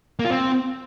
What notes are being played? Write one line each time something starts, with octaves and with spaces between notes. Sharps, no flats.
A#3
F4
C4